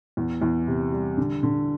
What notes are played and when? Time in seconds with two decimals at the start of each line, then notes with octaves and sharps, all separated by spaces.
0.17 E2
0.42 E2
0.67 C3
0.92 G3
1.17 D3
1.43 D3